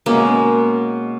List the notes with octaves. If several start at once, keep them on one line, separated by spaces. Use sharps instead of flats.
B2 G#3 A#3 C#4